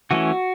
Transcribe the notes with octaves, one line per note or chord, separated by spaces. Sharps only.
E3 A3 C#4 F#4